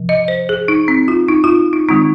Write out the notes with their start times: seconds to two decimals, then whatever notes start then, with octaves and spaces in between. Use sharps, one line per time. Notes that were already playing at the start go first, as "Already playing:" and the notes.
Already playing: C3 F3
0.09 D#5
0.28 C5
0.49 G#4
0.68 D#4
0.88 C4
1.08 F4
1.28 D#4
1.44 F4
1.73 D#4
1.89 D#3 G#3 C4 D#4